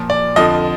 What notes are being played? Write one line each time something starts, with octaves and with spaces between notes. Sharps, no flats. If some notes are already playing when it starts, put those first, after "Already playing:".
Already playing: A#2 F3
D5
F2 D3 F3 D#5